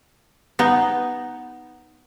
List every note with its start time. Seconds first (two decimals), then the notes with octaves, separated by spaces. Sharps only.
0.59 B3 D#4